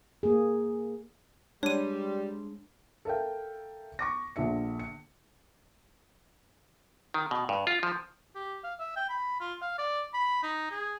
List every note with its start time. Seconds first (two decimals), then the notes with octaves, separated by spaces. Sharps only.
0.23 A#3 G#4
1.63 G3 G#3 D4 C5 C#5 D#7
3.05 A4 A#4 E5 F5 G5
3.99 C#6 D6 A#6
4.36 A#1 D3 E5 C#7
4.79 C#7
7.14 D#3
7.31 B2
7.49 G2
7.67 F4
7.83 F3
8.35 G4
8.64 F5
8.79 E5
8.96 G5
9.09 B5
9.40 F4
9.61 F5
9.78 D5
10.13 B5
10.43 D#4
10.71 G#4